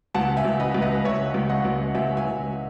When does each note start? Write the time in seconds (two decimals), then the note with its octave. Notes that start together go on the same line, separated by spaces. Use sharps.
0.14 C#2 F#5 A5
0.37 E5 G#5
0.45 C#2
0.60 B4 D#5
0.74 C#2
0.82 B4 D#5
1.04 C#2 C#5 E5
1.34 C#2
1.49 D#5 F#5
1.65 C#2
1.95 C#2 E5 G#5
2.17 E5 G#5
2.25 C#2